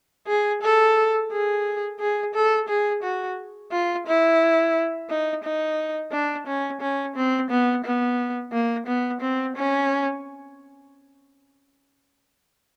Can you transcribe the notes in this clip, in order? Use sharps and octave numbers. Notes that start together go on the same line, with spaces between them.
G#4
A4
G#4
G#4
A4
G#4
F#4
F4
E4
D#4
D#4
D4
C#4
C#4
C4
B3
B3
A#3
B3
C4
C#4